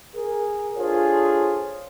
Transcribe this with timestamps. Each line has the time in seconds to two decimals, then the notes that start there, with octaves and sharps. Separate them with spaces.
0.14 G#4 A#4
0.77 D4 F4 G#4 A4 C5 C#5